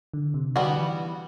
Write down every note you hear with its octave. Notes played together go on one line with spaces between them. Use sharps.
D3
C3
D3 G3 B3 F#4
E3